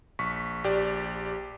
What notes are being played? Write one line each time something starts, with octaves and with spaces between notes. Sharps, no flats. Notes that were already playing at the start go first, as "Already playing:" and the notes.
A#1 C#6 B6
A#1 G4 D5